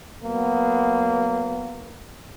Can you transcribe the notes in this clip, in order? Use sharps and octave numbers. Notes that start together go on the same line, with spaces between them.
F#3 A#3 B3